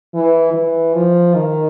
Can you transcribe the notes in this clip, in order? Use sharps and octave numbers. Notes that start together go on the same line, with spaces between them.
E3
E3
F3
D#3